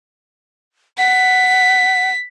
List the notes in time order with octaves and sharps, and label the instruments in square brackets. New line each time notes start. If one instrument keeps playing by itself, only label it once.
[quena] F#5 [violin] B6